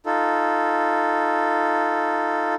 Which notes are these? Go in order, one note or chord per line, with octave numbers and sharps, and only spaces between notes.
D#4 F4 A4